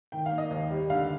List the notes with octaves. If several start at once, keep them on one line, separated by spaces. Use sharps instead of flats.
D#3 G5
F5
A#3
D#5
D#2
G3
D3 F5